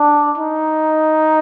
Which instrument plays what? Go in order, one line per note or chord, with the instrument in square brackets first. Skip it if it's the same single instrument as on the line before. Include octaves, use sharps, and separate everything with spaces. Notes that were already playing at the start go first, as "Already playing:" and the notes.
Already playing: [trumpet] D4
D#4